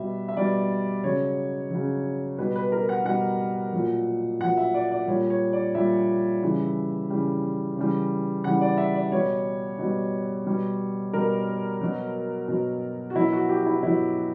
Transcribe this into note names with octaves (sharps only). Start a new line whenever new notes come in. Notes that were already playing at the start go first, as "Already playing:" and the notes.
Already playing: B2 G3 E5
E5
B2 G3 D5
C#3 F#3 C#5
C#3 F#3
B2 G3 B4
B4
A#4
F#5
B2 G3 F#5
A#2 F#3
A#2 F#3 F#5
E5
D5
D5
A#2 G3 C#5
C#5
D5
A#2 G3 E5
C#3 E3 G3
C#3 E3 G3
C#3 E3 G3
C#3 E3 G3 F#5
D5
E5
D5
B2 G3 C#5
B2 G3
B2 G3
B2 G3 A#4
B2 F#3
B2 F#3
F#4
B2 F#3 E4
F#4
G4
E4
B2 F#3 E4